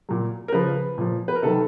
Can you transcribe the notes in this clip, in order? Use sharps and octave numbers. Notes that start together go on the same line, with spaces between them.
A#2 F#3
A#4
C#3 F3 B4
A#2 F3
B4
A#4
C3 D#3 F#3 A4